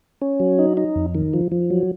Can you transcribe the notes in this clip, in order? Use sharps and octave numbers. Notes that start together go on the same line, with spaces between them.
C#4
F#3
D#4
D#4
F2
D#3
F3
F3
F#3